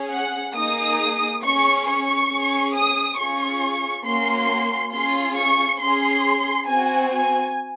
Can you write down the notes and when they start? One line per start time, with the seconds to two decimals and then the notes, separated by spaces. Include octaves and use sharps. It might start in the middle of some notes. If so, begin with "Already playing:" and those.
Already playing: C#4 G#4
0.12 F#5
0.56 A#3 D#4 G#4 D#6
1.44 C#4 G#4 C#6
1.87 C#6
2.31 C#4 G#4
2.75 D#6
3.18 C#4 F4 G#4 C#6
4.05 A#3 C#4 F#4 C6
4.93 C#4 F4 G#4 C6
5.36 C#6
5.80 C#4 G#4 C6
6.67 C4 F#4 G#5
7.12 G#5